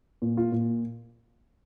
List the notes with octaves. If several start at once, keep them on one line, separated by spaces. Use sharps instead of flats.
A#2
F4
A#2